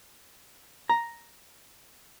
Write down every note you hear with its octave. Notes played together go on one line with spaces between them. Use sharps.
A#5